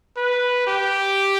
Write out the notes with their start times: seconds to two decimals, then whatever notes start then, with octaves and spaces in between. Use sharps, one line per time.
0.17 B4
0.67 G4